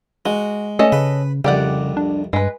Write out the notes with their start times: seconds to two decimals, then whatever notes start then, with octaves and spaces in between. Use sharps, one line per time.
0.26 G#3 F#4
0.79 A3 C#4 A4 D#5
0.92 C#3 B4
1.45 C2 F2 C#3 G4 D5 F#5
1.97 D4
2.33 G2 G#3 B4